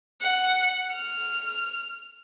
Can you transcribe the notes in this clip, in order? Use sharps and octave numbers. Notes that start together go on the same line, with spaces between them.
F#5
F6